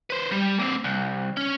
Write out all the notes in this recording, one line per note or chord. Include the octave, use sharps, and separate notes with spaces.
B4 C5
G3
A#3 C4
C2
C#4